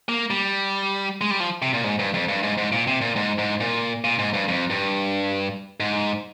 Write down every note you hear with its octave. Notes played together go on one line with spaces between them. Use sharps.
A#3
G3
G#3
G3
F3
C3
A#2
G#2
G2
F2
G2
G#2
G#2
A#2
C3
A#2
G#2
G#2
A#2
A#2
G#2
G2
F2
G2
G#2